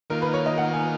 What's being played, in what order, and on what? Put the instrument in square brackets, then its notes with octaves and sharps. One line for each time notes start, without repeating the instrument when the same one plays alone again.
[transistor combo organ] D#3 A#3 F4 [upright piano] A#4
[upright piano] B4
C#5
D#5
F#5
G#5